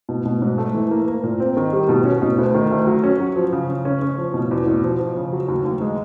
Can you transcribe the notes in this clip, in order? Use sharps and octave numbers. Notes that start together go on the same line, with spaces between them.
B2
B2
G#2
A3
E3
A#3
A#3
A#2
C4
D#3
G3
B2
C#4
B2
D2
D#3
D2
F#3
C#4
F#3
F3
C#3
C#3
C#4
C#4
F3
B2
E2
B2
F3
F3
C#3
F#3
D#2
D#2
G#3